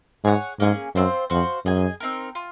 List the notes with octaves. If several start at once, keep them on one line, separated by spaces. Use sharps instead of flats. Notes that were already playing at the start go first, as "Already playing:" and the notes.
G#2 G#4 C#5 F#5
G#2 A#3 C#4 G#4
F#2 C4 F4 C5
F2 F#4 C5 F5
F#2 G#4 D#5 G#5
C4 D#4 A#4
F4